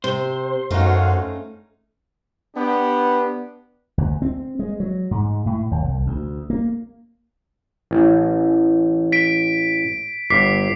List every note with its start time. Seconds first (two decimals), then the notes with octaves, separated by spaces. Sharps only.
0.04 C3 C5
0.71 F#2 A3 C#4 D#4 F#4 F5
2.55 B3 D4 G4
3.98 D2
4.22 C4
4.59 G#3
4.80 F#3
5.11 G#2
5.46 A2
5.71 D#2
5.84 C2
6.07 D2
6.50 A#3
7.91 A1
9.12 B6 D7
10.30 G1 D6 B6 C7